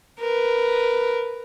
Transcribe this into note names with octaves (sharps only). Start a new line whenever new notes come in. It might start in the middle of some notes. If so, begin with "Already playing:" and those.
A#4 B4